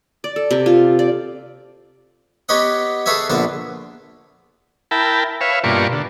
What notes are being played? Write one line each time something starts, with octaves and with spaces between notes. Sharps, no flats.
D5
A4
C3
F4
D5
B3 G4 B4 C#5 D#5 F#5
G#4 A4 B4 C#5 E5 G#5
A#1 D3 B3 B4 F#5 A5
E4 A#4 G5 A5 B5
B4 C#5 E5 F5
G2 B2 A#3 F4 D5 C#6
D3